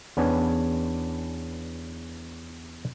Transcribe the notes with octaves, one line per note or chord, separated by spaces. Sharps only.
E2 B3 C#4 D4 B4 G#5